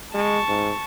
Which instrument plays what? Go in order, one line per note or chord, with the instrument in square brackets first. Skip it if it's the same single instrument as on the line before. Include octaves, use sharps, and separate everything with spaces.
[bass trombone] G#3 [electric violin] A5 C#6
[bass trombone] G#2